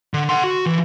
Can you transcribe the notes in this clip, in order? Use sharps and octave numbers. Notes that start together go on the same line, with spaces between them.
D3
F#5 C6
F#4
E3